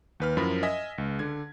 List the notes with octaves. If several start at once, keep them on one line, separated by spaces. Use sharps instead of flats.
D#2 B4 F6
F#2 F3 E4 A#4 B5
D#5 E5 G#5 D#6 A#6 B6
C#2
D3 G#6